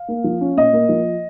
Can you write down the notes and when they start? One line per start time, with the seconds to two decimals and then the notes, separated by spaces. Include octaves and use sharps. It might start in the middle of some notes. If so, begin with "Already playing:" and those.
Already playing: F5
0.08 A#3
0.24 F3
0.41 C#4
0.57 A#2 D#5
0.73 A#3
0.89 F3